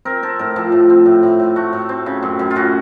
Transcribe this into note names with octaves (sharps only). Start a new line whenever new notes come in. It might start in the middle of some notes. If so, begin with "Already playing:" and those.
C4 A#4
C4 A4
A2 A#4
F3 A4
A2
C4
A2
A2
A2
A3 F#4
A2
C4
C#3
F#2
F#2
F4
C#3 F#4